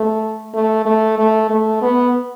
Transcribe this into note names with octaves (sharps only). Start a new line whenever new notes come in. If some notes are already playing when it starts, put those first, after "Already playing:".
Already playing: A3
A3
A3
A3
A3
B3